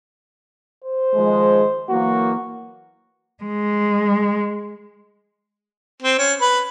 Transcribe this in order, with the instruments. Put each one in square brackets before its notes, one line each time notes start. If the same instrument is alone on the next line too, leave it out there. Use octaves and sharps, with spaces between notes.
[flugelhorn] C5
[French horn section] D#3 F3 G#3
[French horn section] E3 F#3 A#3 [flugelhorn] F#4
[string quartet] G#3
[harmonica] C4
C#4
B4